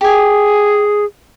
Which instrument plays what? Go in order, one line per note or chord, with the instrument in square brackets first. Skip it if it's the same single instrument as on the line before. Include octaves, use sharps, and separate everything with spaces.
[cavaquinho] G4 G#5 [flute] G#4